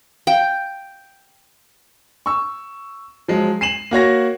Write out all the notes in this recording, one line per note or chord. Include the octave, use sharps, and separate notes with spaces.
F5 G5
C#6 E6
F3 F#3 G#3
C7 D#7 E7 F#7
A#3 F#4 C#5 A#6